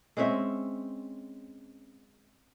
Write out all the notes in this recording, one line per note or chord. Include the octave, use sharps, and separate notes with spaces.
G#3 C4 C#4 E5